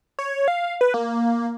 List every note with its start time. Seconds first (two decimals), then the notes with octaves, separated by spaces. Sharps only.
0.19 C#5
0.48 F5
0.81 B4
0.94 A#3